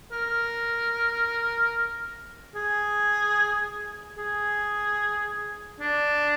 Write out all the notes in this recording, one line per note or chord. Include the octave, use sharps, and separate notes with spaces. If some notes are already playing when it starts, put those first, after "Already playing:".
A#4
G#4
G#4
D4